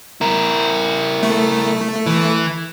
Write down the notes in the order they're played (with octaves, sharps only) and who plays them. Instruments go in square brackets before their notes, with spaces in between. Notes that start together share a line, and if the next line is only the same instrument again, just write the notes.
[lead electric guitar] E4 A#4
[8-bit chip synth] A3
[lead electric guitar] E3